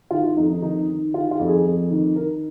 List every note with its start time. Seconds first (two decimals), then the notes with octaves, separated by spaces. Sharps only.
0.11 D#3 F4
0.24 F4
0.37 F2 D#4
0.50 D#4
0.62 D#3 D#4
0.88 D#3
1.14 D#3 F4
1.31 F4
1.39 F2
1.48 G#4
1.66 F2
1.91 D#3
2.16 D#3 A#4